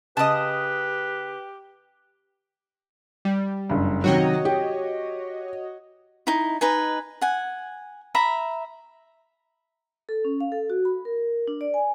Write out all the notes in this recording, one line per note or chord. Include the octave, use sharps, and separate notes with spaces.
C#3 G4 B4 D#5 A5 D#6
G3
F#1 G2
C3 D#3 F#3 F#4 C#5 D#5
G4
D#4 E4
D#4 B4 G#5
F#5 G#5
E5 A#5 B5
A4
C#4
F5
A4
F#4
B5
A#4
D4
D5
G#5